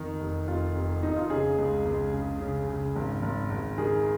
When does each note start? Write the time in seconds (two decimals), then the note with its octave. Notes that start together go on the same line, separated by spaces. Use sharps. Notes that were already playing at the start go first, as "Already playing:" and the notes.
Already playing: F2 D#3 D#4
0.20 F1
0.48 F1 F4
0.75 F1
1.03 F1 D#4
1.16 F4
1.30 C#3 G#4
1.58 C#2
1.85 C#2
2.14 C#3
2.41 C#3
2.68 C#3
2.96 G#1
3.22 G#1
3.50 G#1
3.78 D#3 G#4